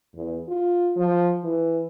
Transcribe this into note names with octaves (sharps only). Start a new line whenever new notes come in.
E2
F4
F3
E3